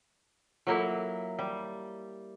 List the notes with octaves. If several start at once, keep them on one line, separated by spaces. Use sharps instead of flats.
F#3 A#3 E4 F4 A4 A#5
G3